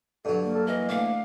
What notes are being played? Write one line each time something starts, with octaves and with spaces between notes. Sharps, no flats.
G2 D3 F#3 A4
A#3
A4
E3 D#5
D2 F5